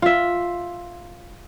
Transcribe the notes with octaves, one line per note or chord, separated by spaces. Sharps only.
F4 E5